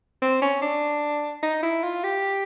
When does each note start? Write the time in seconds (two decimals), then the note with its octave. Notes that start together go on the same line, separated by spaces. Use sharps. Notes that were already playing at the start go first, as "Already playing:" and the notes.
0.22 C4
0.42 C#4
0.62 D4
1.42 D#4
1.63 E4
1.84 F4
2.04 G4